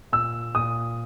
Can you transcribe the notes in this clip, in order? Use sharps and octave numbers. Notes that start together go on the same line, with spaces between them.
A#2 E6
A#2 D#6